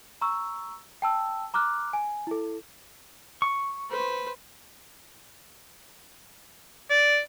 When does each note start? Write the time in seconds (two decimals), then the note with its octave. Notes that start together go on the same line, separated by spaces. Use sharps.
0.21 A#5 C#6 E6
1.02 G5 A5 E6
1.54 A#5 D6 F6 F#6
1.93 G#5
2.27 E4 A4
3.42 C#6
3.91 B4 C5
6.90 D5